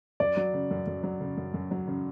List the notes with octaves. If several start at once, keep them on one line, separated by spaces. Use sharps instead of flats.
F#2 D5
F#3
C#3
F#2
F#2
F#3
C#3
F#2
F#2
F#3
C#3